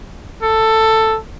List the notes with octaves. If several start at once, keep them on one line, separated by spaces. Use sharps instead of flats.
A4